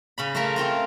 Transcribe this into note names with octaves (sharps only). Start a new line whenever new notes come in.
C#3 C#4 B5
A3 F4 A4 A#4 E5 A5
A3 C4 F4 A#4